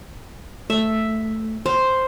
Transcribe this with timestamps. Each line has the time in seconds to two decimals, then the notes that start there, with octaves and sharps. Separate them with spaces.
0.70 A3 E5
1.66 C5 F5